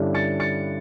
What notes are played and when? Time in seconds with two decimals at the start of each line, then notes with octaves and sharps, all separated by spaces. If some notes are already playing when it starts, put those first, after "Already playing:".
Already playing: G2 D3 G3 C#4 E4
0.14 A6 C#7
0.40 A6 C#7